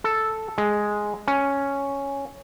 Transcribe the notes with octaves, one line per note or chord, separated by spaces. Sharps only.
A4
G#3
C#4